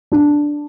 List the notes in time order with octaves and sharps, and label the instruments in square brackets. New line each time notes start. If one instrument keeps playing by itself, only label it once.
[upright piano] D4